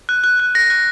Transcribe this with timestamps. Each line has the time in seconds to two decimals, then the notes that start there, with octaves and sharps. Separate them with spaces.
0.09 F#6
0.24 F#6
0.40 F#6
0.55 F#6 A#6
0.70 F#6